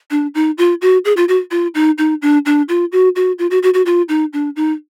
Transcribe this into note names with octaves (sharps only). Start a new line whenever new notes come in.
D4
D#4
F4
F#4
G#4
F4
F#4
F4
D#4
D#4
D4
D4
F4
F#4
F#4
F4
F#4
F#4
F#4
F4
D#4
D4
D#4